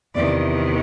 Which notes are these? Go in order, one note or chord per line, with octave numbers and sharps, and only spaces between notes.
E2 C3 D#3 D5